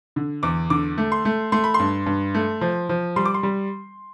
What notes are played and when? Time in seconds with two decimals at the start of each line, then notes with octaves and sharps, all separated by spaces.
0.16 D3
0.43 E2 D6
0.70 D3 D6
0.98 A3
1.12 C6
1.25 A3
1.52 A3 C6
1.64 B5
1.74 C6
1.79 G2
2.06 G2
2.34 A3
2.61 F3
2.89 F3
3.16 G3 C6
3.26 D6
3.34 C6
3.43 G3